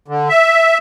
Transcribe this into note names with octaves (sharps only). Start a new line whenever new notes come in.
D3
E5